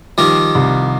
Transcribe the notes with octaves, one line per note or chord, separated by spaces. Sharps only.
D#3 F3 G3
C2